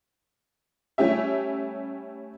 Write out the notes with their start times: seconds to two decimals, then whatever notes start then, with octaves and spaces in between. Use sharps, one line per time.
0.98 G3 A3 C#4 G4 E5